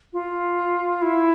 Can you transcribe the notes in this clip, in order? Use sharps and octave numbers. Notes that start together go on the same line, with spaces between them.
F4
E4